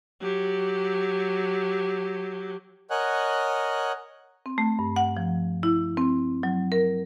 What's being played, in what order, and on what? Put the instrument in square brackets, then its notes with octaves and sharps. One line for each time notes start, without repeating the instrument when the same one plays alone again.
[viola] F#3 G4
[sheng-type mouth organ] A#4 C#5 D#5 F#5 G#5 F#6
[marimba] C4
A3
G2
F#5
F3
E4
C4
F#3
A#4